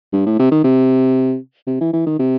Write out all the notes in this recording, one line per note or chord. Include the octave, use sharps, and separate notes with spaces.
G2
A2
C3
D#3
C3
C3
E3
E3
D#3
C3